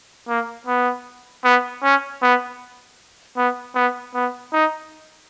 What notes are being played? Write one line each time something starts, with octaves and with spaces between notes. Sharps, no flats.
A#3
B3
B3
C#4
B3
B3
B3
B3
D#4